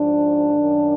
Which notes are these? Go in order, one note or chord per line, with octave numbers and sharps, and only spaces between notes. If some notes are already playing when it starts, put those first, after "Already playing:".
Already playing: G#2 F3 D4
D#3
F#2